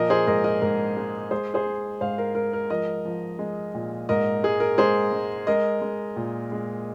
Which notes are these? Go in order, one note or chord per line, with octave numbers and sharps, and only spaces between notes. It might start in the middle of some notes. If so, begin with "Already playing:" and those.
Already playing: A#2 F3 A#4 D#5
G#4 C5
G#2 A#4 D#5
A#4 D#5
G#2 A#4
G#3
G#3 G#4 C5
G#4 C5
G#3
G#2 C5 F5
A#4
G#3 A#4
A#4
F3 A#4 D#5
F3
G#3
A#2
G#2 A#4 D#5
G#3 G#4
A#4
G#3 G#4 C5
G#3
G#3 A#4 D#5
G#3
A#2
G#3